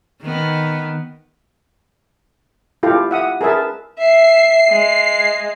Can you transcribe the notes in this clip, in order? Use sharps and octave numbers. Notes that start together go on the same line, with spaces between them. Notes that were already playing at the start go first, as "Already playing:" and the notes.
D#3 B3
E4 F4 G4 A4 F5
E5 F#5 D#6
G#4 A#4 B4 E5 A5
E5 C7
G#3